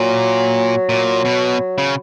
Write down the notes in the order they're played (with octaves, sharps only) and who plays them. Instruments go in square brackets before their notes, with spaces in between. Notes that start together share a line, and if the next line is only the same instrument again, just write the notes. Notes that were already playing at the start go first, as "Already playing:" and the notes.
Already playing: [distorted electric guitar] A#2 [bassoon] F#3
[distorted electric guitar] A#2
B2
C#3